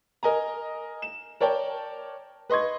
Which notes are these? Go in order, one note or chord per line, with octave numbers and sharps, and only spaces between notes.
A#4 D#5 G#5 A#5
E7
A#4 C#5 D5 G5 A5
B4 D#5 C6 C#6 G#6